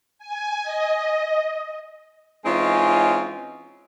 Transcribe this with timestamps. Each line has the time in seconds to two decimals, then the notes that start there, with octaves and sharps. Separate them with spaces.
0.19 G#5
0.63 D#5
2.44 E3 G#3 C4 C#4 D#4 F4